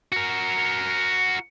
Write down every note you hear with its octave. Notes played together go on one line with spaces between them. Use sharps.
F#4 A#4